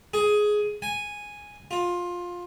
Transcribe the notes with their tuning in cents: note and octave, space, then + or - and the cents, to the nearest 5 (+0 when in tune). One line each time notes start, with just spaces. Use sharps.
G#4 +10
G#5 -5
F4 +15